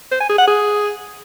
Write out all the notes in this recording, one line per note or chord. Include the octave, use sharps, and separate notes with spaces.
C5
G#5
G#4
F#5
G#4